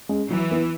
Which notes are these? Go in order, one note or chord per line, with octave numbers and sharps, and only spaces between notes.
G#3 C#4
E3 F#3
B3 E4